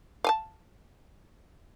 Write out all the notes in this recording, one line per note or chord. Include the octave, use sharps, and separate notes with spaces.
F5 G#5 A5